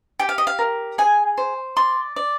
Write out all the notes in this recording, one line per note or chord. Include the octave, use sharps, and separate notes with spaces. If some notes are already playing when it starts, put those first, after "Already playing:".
G4 G5
F5
D#5
F5
A#4
G#4 G#5
C5
D5 C6
D5